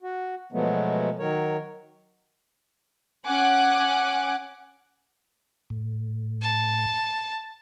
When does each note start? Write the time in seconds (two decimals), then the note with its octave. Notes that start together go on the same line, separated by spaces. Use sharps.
0.03 F#4
0.52 B2 F3 F#3 G#3 A3 B3
1.19 D#3 F#3 A#4 C#5
3.25 C#4 F#5 G#5 D6 F#6
5.70 A2
6.42 A5